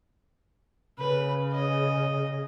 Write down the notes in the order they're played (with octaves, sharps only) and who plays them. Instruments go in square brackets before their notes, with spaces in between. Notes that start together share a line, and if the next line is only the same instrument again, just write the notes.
[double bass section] C#3 [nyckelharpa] B4
[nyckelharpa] D#5